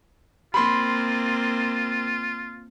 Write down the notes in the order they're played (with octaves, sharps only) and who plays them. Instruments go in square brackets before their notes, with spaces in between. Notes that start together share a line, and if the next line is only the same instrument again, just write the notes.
[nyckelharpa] A#3 C4 [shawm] F4 [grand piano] B5 C6